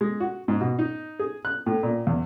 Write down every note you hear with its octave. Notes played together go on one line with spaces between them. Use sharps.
G#3
F#4
G#2
B2
D#4
G#4
F#6
A2
A#2
E2